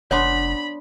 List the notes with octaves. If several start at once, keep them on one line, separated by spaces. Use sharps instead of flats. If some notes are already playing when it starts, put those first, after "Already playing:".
F1 B3 D4 C#5 B5 C6